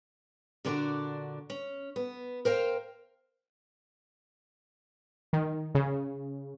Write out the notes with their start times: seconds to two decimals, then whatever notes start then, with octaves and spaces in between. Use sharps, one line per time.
0.65 A#2 D3 D4 D#4 F#4 D5
1.50 C#4
1.96 B3
2.45 A#4 C5 F5 G5
5.33 D#3
5.75 C#3